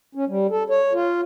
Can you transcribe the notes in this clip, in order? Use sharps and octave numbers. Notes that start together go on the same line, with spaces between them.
C#4
G3
A4
C#5
F4